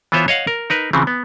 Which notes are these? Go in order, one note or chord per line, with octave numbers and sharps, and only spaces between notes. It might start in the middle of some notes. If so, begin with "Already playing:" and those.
E3 B3 F4 C5 C#5 E5
C#5 D#5 F5 F#5
A#4
D#4 A#4 B4
C#3 E3 F3 C4
B3